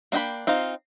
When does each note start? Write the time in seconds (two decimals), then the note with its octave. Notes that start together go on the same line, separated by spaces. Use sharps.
0.12 A#3 D4 D#5 G5 B5
0.47 C4 D#4 F4 F5